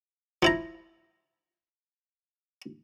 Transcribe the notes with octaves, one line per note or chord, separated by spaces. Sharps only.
F3 E4 A#5